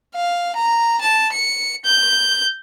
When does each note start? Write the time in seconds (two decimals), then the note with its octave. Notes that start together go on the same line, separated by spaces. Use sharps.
0.15 F5
0.55 A#5
1.01 A5
1.32 C#7
1.84 G6